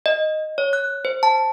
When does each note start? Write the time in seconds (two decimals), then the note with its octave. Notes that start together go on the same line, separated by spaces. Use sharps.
0.06 D#5
0.58 C#5
0.73 F#6
1.05 C5
1.23 A5